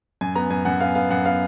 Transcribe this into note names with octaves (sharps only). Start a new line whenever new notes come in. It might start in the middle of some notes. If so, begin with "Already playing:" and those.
F#2 G#5
B3 A#5
F#2 G#5
F#2 F#5
B3 F5
B3 F5
F#2 F#5
B3 F5